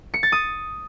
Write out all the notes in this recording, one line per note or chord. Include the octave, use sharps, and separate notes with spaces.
C#7
A6
D#6